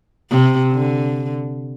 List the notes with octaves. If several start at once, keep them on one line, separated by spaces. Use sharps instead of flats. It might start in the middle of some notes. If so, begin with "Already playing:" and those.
C3
D3